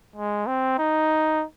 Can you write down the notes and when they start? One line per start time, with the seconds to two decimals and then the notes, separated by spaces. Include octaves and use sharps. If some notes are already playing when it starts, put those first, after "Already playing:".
0.16 G#3
0.47 C4
0.78 D#4